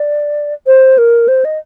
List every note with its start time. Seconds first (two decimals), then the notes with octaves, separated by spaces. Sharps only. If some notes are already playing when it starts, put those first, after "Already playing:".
Already playing: D5
0.67 C5
0.98 A#4
1.28 C5
1.45 D#5